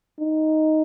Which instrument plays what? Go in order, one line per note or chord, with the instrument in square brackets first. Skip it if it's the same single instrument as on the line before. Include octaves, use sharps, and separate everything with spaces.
[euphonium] D#4